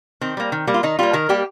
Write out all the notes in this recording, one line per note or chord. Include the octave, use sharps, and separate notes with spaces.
D#3 C4
G3 A#3
D#3
G3 A#3
F4
D#3 D#4
G3 A#3 F4
D#3 A#4
G3 A#3 G4